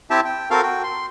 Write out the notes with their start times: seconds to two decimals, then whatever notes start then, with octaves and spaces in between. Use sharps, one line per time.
0.10 C4 E4 G4 E5 G5 A5
0.25 G5
0.51 C4 F#4 A4 A#4 F5 F6
0.63 F#4 G5
0.83 C6